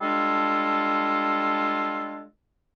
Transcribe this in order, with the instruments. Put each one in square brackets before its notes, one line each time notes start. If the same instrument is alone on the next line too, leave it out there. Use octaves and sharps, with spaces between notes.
[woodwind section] G3 G#3 D4 F4 A4